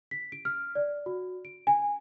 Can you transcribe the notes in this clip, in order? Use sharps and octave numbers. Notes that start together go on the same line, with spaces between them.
B6
D7
F6
D5
F#4
D7
G#5